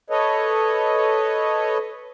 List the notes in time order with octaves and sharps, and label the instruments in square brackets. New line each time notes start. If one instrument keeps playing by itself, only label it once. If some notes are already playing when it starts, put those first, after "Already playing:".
[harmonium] A4 B4 C#5 D#5